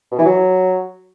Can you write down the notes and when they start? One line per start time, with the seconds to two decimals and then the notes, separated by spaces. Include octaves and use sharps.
0.11 B2
0.18 E3
0.25 F#3